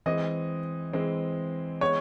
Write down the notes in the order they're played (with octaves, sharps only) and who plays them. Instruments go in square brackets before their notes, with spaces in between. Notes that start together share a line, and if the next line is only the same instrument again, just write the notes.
[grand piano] E3 G#3 C4 [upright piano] D#5
[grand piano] E3 G#3 C4
[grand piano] E3 G#3 B3 [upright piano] C#5